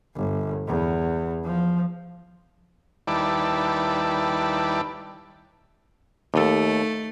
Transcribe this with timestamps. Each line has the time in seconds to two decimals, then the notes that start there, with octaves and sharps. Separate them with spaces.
0.16 G1
0.68 E2
1.44 F3
3.07 D#2 G3 E4 B4 D5 A5
6.34 D#2 A3 A4